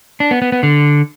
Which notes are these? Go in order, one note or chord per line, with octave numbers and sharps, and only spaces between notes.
D4
B3
B3
B3
D3